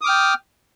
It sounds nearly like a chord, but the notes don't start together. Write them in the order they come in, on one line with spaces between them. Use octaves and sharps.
D#6 D6 F6 G5